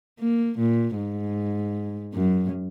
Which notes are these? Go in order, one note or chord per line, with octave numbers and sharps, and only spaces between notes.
A#3
A#2
G#2
F#2